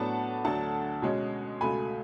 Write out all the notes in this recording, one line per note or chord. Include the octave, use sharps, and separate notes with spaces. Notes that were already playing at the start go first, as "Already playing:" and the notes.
Already playing: A2 F#3 B3 D4 F#5 A5
D2 D3 F#3 A3 D4 F#5 A5
B2 G#3 C#4
C#2 B2 A3 G#5 B5